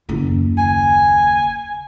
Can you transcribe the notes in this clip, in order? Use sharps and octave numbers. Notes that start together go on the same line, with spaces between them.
F#1 D#2
G#5